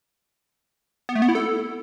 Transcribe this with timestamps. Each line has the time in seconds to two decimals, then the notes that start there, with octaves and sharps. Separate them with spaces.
1.09 B3
1.15 A3
1.22 B3
1.29 E4
1.35 A4